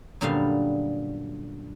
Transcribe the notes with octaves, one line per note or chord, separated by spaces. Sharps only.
F#2 A#2 D3 G3 B3 F5